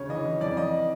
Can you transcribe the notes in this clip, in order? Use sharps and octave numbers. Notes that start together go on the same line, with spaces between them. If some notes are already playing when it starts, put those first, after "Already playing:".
Already playing: D2 C#3 C#5
E3 D#5
E3
F2 D5
F2 D#5